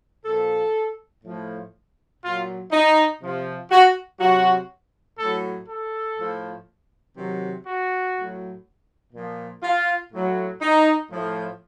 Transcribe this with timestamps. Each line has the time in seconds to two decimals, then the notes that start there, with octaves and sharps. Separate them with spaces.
0.25 A#2 F3 A4
1.24 A2 F3
2.22 A#2 F#3 F4
2.72 D#4
3.20 C3 F3
3.70 F#4
4.20 C3 F#3 F#4
5.18 A2 F#3 A4
5.68 A4
6.17 A2 F3
7.16 C3 D#3 F#3
7.66 F#4
8.14 A2 F#3
9.13 A#2 F3
9.62 F4
10.12 A2 F#3
10.61 D#4
11.10 A2 F3